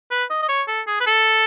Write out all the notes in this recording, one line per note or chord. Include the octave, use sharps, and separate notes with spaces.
B4
D#5
D#5
C#5
A4
G#4
B4
A4